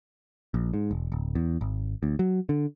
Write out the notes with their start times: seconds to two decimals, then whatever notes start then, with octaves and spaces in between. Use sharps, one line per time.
0.54 A#1
0.74 G#2
0.91 E1
1.12 D1
1.35 E2
1.61 G#1
2.03 D2
2.19 F#3
2.49 D3